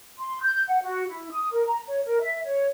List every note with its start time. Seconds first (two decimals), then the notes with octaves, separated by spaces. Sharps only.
0.18 C6
0.42 G6
0.68 F#5
0.82 F#4
1.08 E4
1.31 D#6
1.52 A#4
1.66 A#5
1.86 C#5
2.06 A#4
2.21 E5
2.45 C#5